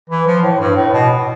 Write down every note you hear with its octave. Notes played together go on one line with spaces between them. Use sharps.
E3
F3
A2
G2
A2
B2